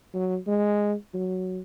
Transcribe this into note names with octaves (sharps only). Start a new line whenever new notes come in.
F#3
G#3
F#3